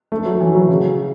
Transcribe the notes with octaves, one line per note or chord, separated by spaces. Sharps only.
A3
F#3
E3
F#3
C#3